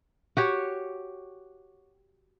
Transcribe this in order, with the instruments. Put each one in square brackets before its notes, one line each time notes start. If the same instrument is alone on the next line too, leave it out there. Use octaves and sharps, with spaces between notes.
[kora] F#4 G4 C#5